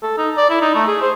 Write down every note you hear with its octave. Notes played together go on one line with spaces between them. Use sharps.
A4
D#4
D5
E4
D#4
A3
G#4
C5